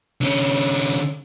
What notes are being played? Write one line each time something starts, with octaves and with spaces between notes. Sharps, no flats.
D3 C#4